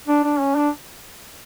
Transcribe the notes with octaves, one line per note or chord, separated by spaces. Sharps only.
D4
D4
C#4
D4